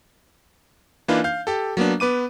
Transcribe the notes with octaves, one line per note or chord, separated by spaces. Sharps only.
E3 A#3 D4 D#4 F4 B4
F5 G6
G4 A4
F#3 A#3 B3 D4
B3 B4 D6 D#7